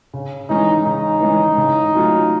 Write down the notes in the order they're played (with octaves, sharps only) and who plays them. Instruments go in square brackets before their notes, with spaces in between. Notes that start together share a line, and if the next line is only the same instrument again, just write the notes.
[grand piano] C#3
[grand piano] E3 G#3 C#4 [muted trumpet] D#4
[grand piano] C#3 [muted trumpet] D#4
[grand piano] E3 G#3 C#4
C#3
F#3 A3 C#4 F4